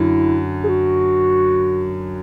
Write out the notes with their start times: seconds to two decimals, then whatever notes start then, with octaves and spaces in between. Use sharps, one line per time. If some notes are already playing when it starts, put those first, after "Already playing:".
Already playing: F#2 D3 E4
0.64 G#4
0.68 F#4